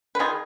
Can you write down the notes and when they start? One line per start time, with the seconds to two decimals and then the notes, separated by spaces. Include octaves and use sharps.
0.15 B4
0.19 D#3 F4 G#4